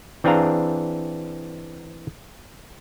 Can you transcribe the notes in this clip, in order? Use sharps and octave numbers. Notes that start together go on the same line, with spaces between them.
E3 C4 D4 G#4 F5 A#5